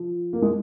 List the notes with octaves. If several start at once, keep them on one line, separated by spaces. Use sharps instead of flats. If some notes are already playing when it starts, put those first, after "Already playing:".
Already playing: F3
A#3
G#3